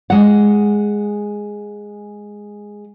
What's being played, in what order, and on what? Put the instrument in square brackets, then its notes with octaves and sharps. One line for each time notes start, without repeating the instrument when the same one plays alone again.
[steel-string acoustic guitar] G#3 F#5